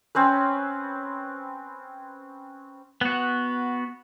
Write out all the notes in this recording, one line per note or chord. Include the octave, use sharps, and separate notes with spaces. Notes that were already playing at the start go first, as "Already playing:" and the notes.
C4 C#4 B4
B3 F#4